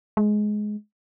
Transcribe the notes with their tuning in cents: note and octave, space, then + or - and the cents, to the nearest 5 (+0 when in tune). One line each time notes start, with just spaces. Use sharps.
G#3 +15